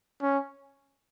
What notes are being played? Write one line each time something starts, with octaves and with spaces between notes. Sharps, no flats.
C#4